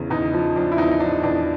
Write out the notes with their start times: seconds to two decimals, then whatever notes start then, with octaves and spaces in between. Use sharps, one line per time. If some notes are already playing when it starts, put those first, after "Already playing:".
Already playing: E2 C#3
0.10 E2 D#4
0.33 F3
0.56 F3 D4
0.72 E4
0.78 E2 D#4
1.00 F3 D4
1.23 E2 D4